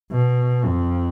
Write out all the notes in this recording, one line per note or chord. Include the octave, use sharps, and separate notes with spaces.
B2
F2